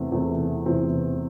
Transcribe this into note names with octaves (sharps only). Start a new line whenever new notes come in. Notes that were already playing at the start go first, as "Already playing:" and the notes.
Already playing: E2 C3 E3 A3 C4
E2 C3 E3 A3 C4
E2 C3 E3 A3 C4